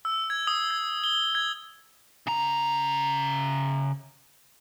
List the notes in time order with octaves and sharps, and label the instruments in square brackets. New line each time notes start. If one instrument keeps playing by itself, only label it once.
[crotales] E6
G#6
D#6
G#6
G7
G#6
[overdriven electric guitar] C#3 A#5